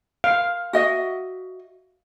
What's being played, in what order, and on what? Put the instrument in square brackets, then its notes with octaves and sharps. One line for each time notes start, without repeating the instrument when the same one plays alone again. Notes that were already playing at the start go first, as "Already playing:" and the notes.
[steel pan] F5
[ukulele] F#4 D#5 E5